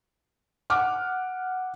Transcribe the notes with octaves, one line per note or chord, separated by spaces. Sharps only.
F#5 D6 F6